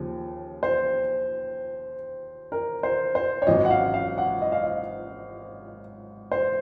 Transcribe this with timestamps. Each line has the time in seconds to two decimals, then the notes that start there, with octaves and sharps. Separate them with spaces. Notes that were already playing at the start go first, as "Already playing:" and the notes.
Already playing: D#2 C#3 F3
0.63 C5
2.52 A#4
2.83 C5
3.15 C5
3.42 C#5
3.47 G#1 G#2 F#3 C#4 D#5
3.65 F#5
3.70 F5
3.94 F5
4.18 F#5
4.42 D#5
4.52 F5
4.63 D#5
6.32 C5